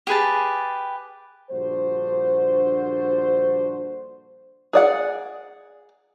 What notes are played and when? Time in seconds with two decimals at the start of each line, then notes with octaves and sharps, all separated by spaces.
0.07 G4 G#4 B4 A5
1.50 A#1 G2 D3 F#4 C5
4.73 G#4 D5 F#5